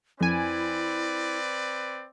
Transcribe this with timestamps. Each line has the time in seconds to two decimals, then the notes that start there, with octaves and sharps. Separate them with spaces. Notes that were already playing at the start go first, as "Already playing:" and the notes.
0.21 F2 C4 E4 B4 D5 G#5